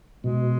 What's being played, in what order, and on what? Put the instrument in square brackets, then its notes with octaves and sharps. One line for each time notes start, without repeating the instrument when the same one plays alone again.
[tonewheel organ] B2 [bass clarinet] G#3